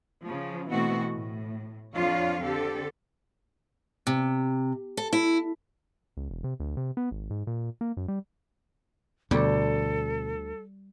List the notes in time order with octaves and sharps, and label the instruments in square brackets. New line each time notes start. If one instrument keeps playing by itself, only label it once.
[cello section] C#3 F3
B2 E3 A3 C4 F#4
A2
F2 F3 D4 F4 C#5 F5
D3 C4 G4 A4
[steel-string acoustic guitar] C3
A4
E4
[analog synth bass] C#2
E1
C3
D2
C3
B3
G#1
G#2
A#2
A#3
F#2
G3
[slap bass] D2 [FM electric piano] B2 D3 [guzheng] G3 [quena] A4